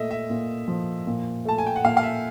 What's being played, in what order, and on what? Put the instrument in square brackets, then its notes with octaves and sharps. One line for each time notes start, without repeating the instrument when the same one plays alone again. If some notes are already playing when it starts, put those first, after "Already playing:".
Already playing: [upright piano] A#2 A3 [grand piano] D#5 E5
[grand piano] E5
[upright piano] A#2
F3
A#2
[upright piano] A3 [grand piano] A5
[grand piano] G#5
G5
F#5
[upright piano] A#2 [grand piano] F5
[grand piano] F5
E5